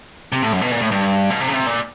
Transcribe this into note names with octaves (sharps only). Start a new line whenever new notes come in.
C3
A2
F#2
B2
A#2
A2
G2
B2
C3
C#3
C3
A#2